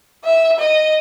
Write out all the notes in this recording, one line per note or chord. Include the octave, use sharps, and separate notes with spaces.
E5
D#5